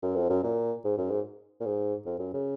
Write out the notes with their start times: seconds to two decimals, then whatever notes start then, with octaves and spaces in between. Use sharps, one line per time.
0.03 F#2
0.16 F2
0.30 F#2
0.44 A#2
0.84 G#2
0.98 F#2
1.10 G#2
1.60 A#2
1.66 G#2
2.06 F2
2.19 F#2
2.34 C#3